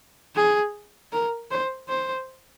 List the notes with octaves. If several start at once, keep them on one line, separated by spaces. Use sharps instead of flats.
G#4
A#4
C5
C5